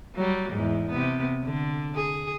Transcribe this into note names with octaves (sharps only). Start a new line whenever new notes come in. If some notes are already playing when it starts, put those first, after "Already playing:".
F#3 G3
E2 G#2
C3 B3
D3
G#4